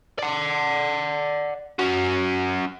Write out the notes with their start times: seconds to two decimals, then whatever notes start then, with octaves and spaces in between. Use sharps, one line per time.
0.19 D5 F#5
1.79 C#4 F#4